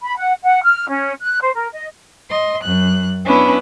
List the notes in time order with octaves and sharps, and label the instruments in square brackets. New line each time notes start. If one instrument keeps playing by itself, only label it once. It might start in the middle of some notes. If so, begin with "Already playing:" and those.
[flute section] B5
F#5
F#5
F6
C#4
F#6
C5
A#4
D#5
[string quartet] D#5 C6
F#2 F#6
B3 C#4 D4 E4 B4